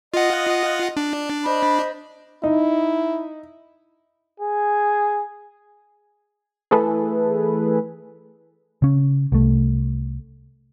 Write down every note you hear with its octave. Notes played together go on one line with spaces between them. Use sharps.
F4 D#5 F#5
D4
C5 D#5 B5
D#4 E4
G#4
E3 A3 G#4 A4 B4
C#3 C#4
C2 A3